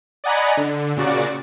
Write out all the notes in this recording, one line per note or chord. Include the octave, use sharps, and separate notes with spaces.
D5 D#5 F#5 G#5 A#5 B5
D3
A#2 C#3 F#4 D5